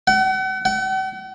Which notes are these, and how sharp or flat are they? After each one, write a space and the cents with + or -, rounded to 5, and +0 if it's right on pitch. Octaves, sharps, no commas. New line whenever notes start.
F#5 +40
F#5 +45